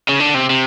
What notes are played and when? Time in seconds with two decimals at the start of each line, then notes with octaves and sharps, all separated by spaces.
0.09 C#3
0.20 D3
0.34 C3
0.50 C3